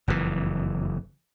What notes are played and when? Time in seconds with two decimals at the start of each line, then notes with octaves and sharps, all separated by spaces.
0.08 F#1 F2 G#2 E3